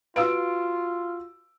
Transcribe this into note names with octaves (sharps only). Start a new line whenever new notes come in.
F4 F#4 B4 F5 E6 D7